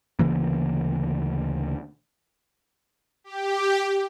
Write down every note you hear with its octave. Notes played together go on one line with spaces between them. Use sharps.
D2 C#3 E3 A#3
G4